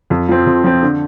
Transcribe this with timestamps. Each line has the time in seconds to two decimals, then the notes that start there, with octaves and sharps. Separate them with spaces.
0.10 F2
0.28 F3 C4
0.46 F2
0.64 F3 C4
0.83 D3